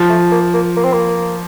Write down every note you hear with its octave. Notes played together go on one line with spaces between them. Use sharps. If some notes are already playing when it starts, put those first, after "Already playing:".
Already playing: F3
A3
A#3
A#3
A#3
C4
A#3